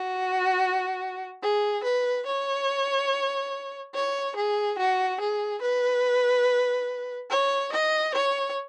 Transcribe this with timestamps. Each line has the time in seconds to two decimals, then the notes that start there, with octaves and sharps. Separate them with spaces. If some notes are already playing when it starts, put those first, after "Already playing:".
Already playing: F#4
1.42 G#4
1.84 B4
2.26 C#5
3.94 C#5
4.36 G#4
4.78 F#4
5.20 G#4
5.62 B4
7.30 C#5
7.72 D#5
8.14 C#5